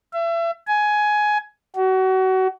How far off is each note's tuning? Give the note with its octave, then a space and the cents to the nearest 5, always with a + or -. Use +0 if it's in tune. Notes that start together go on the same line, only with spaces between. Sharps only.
E5 +35
G#5 +15
F#4 +30